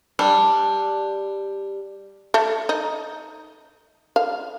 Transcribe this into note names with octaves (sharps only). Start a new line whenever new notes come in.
G3 D4
A3
D#4
F5